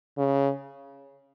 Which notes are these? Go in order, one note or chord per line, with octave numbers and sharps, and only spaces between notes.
C#3